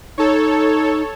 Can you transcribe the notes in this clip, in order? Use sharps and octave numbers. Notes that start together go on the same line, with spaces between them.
D#4 A4 C#5